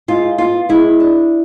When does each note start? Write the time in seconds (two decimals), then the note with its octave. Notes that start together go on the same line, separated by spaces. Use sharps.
0.08 G#2 F4
0.38 B3 F4
0.69 G#3 E4
1.00 D4